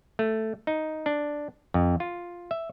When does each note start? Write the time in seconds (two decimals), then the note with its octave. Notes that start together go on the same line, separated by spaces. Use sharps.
0.19 A3
0.67 D#4
1.06 D4
1.74 F2
2.00 F4
2.51 E5